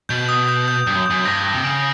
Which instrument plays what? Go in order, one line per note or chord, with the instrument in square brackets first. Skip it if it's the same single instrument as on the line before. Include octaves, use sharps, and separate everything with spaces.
[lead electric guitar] B2 [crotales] G6
[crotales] D#6
G6
G6
[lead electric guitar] G2 [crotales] G6
[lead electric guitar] F#2
[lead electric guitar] F#2 [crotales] G6
[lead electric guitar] G2 [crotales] A#6
[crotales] A#6
[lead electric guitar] C3
[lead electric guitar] C#3 [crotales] D7